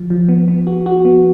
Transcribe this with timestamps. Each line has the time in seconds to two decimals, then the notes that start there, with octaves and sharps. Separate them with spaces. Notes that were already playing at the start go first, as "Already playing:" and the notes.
Already playing: F3
0.10 F3
0.29 B3
0.48 B3
0.67 F#4
0.86 F#4
1.05 B3